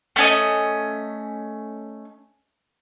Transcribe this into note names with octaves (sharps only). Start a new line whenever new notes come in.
A3 C#4 D#5